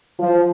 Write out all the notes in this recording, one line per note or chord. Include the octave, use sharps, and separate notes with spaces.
F3